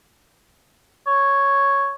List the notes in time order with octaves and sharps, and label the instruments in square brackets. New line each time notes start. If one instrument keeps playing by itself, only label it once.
[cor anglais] C#5